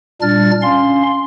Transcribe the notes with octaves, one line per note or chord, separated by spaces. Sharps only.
A#2 G3 D4 F6 A6
C#4 F5 C6